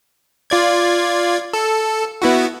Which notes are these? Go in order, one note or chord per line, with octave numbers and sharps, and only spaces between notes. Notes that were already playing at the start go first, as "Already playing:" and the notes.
F4 D5 G#6
A4
B3 E4 F#4